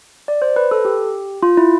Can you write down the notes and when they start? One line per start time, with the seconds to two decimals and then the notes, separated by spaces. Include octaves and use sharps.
0.28 D5
0.42 C5
0.56 B4
0.71 A4
0.85 G4
1.43 F4
1.57 E4